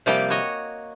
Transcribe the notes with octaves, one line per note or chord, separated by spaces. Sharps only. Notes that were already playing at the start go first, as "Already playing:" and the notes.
C3 F3 G3 A#3 D5 G5
F#4 C#5 D#5